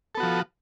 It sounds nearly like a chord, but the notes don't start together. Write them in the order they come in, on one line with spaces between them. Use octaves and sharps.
A4 B3 F#4 F3